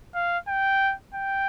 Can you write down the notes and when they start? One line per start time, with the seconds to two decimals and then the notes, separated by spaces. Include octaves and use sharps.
0.15 F5
0.48 G5
1.14 G5